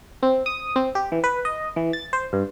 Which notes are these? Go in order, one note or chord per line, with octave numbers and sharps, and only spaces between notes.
C4
D#6
C4
G4
E3
B4
D#5
E3
A6
C5
G2